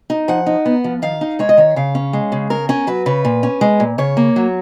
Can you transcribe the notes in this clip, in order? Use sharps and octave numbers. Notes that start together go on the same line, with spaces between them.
D#4
F3 F#5
D#4
B3
F3
D#3 F5
D#4
G#3 C#5
D#5
D#3 C#5
C#3 F5
C#4
G#3
C#3
C#3 A#4
C#4 A#4
F#3 B4
C#3 B4
A#2
C#4
G#3
A#2
C#3 C#5
A#3
F#3